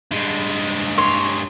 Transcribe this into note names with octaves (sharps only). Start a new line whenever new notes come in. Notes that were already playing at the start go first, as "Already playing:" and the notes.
G2 G#3
C#5 C6